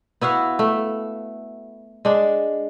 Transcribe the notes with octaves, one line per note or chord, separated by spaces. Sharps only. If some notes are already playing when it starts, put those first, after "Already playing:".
B3 E4 F#4 F5
A3
G#3 D4